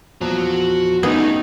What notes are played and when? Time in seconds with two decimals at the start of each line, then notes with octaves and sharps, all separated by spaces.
0.21 E2 A#2 F3 F#4 A#5
1.03 G3 A3 B3 C#4 D#4 G#4 G#6